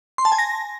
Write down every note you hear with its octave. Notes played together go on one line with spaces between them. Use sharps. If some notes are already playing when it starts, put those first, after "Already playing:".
C6
A5
G#5
A#6